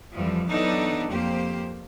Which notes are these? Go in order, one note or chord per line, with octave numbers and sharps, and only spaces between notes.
F2 E3 F3 G3
E3 F#3 B3 D4 D#4 A4
F2 A#3 G4 C5